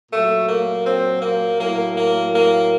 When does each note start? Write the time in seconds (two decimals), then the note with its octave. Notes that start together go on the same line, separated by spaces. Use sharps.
0.11 A#2 F#3 A3
0.48 A#3
0.85 C4
1.21 A#3
1.58 A2 F#3 A#3
1.95 A#3
2.31 A#3